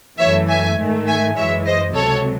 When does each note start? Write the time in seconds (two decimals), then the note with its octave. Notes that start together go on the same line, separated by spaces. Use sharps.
0.18 F#2 E3 A3 C#5 E5
0.48 E5 G#5
0.77 G#2 D#3 A3
1.07 E5 G#5
1.36 F#2 E3 G#3 C#5 E5
1.65 C5 D#5
1.94 C#2 C3 F#3 A4 C#5